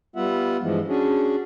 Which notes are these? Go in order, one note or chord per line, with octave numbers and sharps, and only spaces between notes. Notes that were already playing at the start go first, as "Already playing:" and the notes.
G3 B3 F4 E5 F#5
G2 E3 F3 G#3
C#4 D4 F#4 G#4